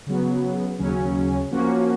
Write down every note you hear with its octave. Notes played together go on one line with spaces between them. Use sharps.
C#3 F#3 B3
D#2 C#3 F#3 C#4
F3 A#3 C#4 F#4